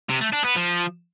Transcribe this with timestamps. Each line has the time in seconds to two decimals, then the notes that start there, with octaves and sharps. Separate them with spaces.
0.09 C3
0.21 A3
0.32 D4
0.44 B3
0.56 F3